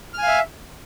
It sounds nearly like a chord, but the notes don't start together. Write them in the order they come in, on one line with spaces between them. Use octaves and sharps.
F6 G#5 F5 E5